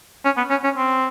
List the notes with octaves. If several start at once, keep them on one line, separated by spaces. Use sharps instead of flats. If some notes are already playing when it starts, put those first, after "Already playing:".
C#4
B3
C#4
C#4
C4